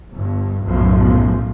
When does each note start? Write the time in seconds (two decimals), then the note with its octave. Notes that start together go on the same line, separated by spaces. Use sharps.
0.13 G1 G2
0.65 B1 F#2 A2 F3